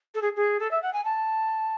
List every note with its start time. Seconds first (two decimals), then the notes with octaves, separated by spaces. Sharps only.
0.14 A4
0.22 G#4
0.36 G#4
0.59 A4
0.71 E5
0.82 F#5
0.93 G#5
1.04 A5